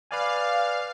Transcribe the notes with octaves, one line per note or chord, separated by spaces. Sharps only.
B4 D5 F5 G#5